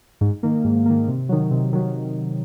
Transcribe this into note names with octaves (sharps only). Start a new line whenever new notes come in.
G#2
D#3 A#3
G#2
D#3 A#3
C3
D#3 F#3
C3
D#3 F#3